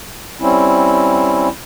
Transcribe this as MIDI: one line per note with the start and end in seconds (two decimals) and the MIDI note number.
0.41 1.49 55
0.41 1.49 60
0.41 1.49 61
0.41 1.49 64